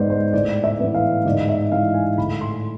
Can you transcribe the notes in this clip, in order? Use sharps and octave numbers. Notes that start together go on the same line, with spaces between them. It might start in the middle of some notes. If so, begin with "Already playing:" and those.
Already playing: G#2 G#3 B3 C5 D5
C5
A2 D5
E5
E3 B3
F5
G#2 D5
E5
E3 G#3 F5
G#5
A2 B5
C6